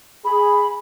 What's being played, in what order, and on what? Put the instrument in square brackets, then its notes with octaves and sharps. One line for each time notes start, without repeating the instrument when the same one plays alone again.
[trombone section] G#4 [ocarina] B5